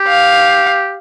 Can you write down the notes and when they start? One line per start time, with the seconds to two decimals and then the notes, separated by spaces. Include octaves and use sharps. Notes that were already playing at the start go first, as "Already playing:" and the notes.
Already playing: G4
0.08 F5